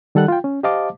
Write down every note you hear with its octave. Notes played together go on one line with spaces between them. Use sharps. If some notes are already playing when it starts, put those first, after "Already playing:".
D#3 G3 A4 F#5 F#6
F4 G5
C#4
G4 C5 D#5 F5 A5 D6